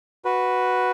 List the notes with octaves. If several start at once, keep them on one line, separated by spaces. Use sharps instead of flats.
F#4 B4